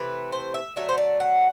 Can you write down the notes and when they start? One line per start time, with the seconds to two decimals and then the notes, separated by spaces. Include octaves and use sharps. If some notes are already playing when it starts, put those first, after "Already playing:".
Already playing: C3 E3 A3 B4
0.32 C5
0.54 E5
0.76 D3 F#3 A3 E5
0.89 C5
0.98 D5
1.20 F#5